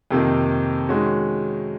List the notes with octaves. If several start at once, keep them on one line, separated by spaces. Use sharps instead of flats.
F2 C3 D#3 A#3 D#4
D#3 G#3 C#4 F#4